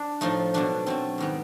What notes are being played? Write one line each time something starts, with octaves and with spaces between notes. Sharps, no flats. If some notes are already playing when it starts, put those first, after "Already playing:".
Already playing: D4
A2 F3 A3 D#4
B2 F#3 A3 D4
B2 F#3 A3 C4
G#2 D#3 G3 B3